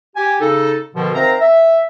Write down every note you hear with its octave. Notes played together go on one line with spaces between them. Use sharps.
G4 G#5
C#3 D#4 A4
B2 D3 D#3 F3
D#3 C4 C5 E5 F5 A#5
E5